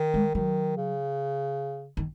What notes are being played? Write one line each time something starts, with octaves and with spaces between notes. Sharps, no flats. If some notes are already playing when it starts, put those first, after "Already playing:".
Already playing: D#3
G#3
D#3 F#3
C#3
D#3